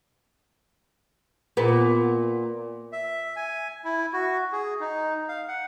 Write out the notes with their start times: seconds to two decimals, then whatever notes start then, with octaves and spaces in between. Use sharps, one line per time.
1.57 A#2 B3
2.93 E5
3.36 G#5
3.84 E4
4.13 F#4
4.52 G#4
4.80 D#4
5.29 F5
5.48 F#5